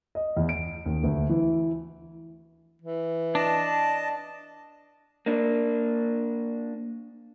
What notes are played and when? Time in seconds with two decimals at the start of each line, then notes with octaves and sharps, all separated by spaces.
0.15 D#5
0.37 E2
0.49 D7
0.86 D#2
1.04 D2
1.29 E3
2.82 E3
3.35 D4 D#5 A5
5.26 A#3 D4